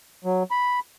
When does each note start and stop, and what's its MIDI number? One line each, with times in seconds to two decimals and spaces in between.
0.25 0.43 54
0.51 0.79 83